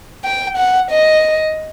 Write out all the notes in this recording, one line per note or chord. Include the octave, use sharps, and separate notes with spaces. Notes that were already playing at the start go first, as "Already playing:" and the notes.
G5
F#5
D#5